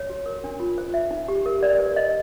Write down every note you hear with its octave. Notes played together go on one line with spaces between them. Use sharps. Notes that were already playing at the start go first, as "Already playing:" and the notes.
Already playing: C#5
F#4
A#4
D4
F4
C5
E5
D#4
G4
A#4
D5
B4
D#5